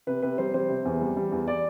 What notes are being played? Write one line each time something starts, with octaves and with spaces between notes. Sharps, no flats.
C3 B4
C3 B4
G3 C5
G3 C5
C3
E2
G3
G3
E2
D5